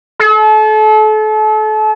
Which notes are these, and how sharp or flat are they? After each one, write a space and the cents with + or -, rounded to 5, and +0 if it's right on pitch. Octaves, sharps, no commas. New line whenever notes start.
A4 -35